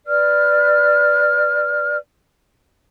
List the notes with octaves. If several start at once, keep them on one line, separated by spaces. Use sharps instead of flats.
B4 D5 F6